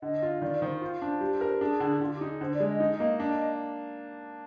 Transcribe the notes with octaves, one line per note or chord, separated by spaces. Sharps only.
D3 D#5
F4
D#3 D5
D#3 C5
F4 C5
D4
G3
A#4
D4 G#4
D3
D3 F4
G4
D#4
G#4
D3 C5
D5
G#3
D#5
D#4
A#3
D4